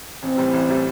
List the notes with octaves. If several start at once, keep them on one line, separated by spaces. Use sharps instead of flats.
A1 C4
A2 E3 G3
A1
A2 E3 G3